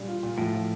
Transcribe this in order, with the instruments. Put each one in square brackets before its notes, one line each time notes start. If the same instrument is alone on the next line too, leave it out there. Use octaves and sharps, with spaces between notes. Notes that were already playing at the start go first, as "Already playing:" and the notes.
Already playing: [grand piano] A#2 G3 D4
F4
A#2
[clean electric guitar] A2 [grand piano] F3
[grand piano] F3